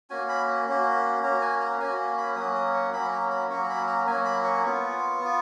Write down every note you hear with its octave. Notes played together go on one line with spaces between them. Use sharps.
A#3 C#4 F#4 G#5
B5
A#3 C#4 F#4
A#3 C#4 F#4 A#5
G#5
A#5
A#3 C#4 F#4 G#5
B5
F#3 A#3 C#4 F#4 D#6
D#6
C#6
F#3 A#3 C#4 F#4 B5
A#5
B5
F#3 A#3 C#4 F#4 C#6
A#5
B5
A#5
F#3 A#3 C#4 F#4 G#5
B5
C#6
B3 F4 C#6
B3 F4